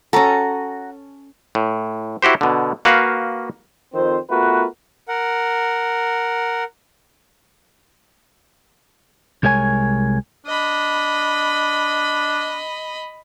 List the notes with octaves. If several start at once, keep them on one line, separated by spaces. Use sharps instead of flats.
C#4 F#4 A4 A#5
A2
E4 F#4 G4 C5
B2 D3
A#3 F#4 B4 F5
F2 D#3 F3 C4 C5
A3 B3 F4 F#4 A#4 B4
A#4 F#5
C2 G#3 A#4 C#5 G#5
D4 D#5 B5